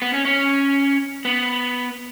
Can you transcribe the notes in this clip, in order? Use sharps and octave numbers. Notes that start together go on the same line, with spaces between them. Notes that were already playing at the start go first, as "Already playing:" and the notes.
B3
C#4
C#4
B3